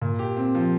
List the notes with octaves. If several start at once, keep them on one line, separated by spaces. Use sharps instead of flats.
A#2
G4
C4
F3